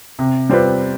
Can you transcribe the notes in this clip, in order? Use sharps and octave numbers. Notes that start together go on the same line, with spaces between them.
C3
G3 C4 F4 B4